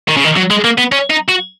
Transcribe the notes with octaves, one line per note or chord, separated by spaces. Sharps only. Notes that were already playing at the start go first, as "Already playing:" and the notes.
D#3
C#3
D#3
F#3
G#3
A#3
B3
C#4
D#4
F#4